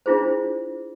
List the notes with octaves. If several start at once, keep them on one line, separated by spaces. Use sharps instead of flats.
D4 E4 F4 G#4 C5